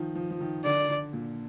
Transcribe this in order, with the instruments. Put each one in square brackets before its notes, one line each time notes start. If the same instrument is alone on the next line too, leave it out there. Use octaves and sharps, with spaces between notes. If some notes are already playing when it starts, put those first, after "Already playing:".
Already playing: [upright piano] D#3 F3
F3
F3
D#3
[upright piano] D3 [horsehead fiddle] D5
[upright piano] D3
A#2